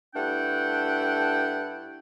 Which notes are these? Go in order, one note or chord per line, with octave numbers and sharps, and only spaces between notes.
G2 A3 D4 E4 F#5 G5